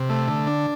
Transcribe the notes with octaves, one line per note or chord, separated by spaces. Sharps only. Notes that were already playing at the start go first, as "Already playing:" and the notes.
Already playing: C3
A3
D3
D4